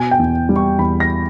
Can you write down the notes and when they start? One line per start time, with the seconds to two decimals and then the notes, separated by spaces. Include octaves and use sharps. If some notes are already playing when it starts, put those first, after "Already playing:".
Already playing: B2 G#5
0.11 G5
0.19 E2
0.49 G3
0.56 C#6
0.79 E2 B5
1.00 A#6